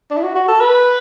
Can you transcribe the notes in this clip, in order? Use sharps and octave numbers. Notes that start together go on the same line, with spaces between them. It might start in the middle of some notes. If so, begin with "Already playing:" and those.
D4
E4
F#4
F#4
A4
B4